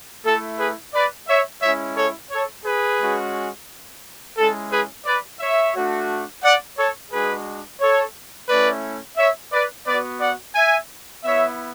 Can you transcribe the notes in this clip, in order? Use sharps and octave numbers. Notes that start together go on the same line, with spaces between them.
A3 E4 A4
G#4 B4
B4 D5
C#5 E5
G#3 C#4 E4 C#5 E5
A4 C#5
A4 C#5
G#4 B4
G#3 C#4 F#4
G#3 C#4 E4 A4
G#4 B4
B4 D5
C#5 E5
A3 D4 F#4
D5 F#5
A4 C#5
G#3 D4 F#4 G#4 B4
A4 C#5
A3 C#4 E4 B4 D5
C#5 E5
B4 D5
B3 F#4 B4 D5
D5 F#5
E5 G#5
B3 E4 C#5 E5